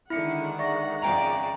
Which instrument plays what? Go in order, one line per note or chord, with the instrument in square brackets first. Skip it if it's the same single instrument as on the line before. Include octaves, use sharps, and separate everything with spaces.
[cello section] D3 [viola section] D#3 G#3 F#5 [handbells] E4 [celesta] E5 C#7
[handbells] D5 [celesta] E5 C#6 A#6
[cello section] F2 C#3 D5 [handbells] G5 A#5